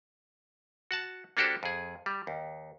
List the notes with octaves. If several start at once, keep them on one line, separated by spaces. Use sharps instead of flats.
F#4 F#5 A5
A#3 D4 F#4 G4 A4 C5
F2 G#4
G3
D#2